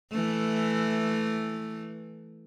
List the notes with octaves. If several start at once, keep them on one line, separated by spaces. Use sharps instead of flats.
E3 A3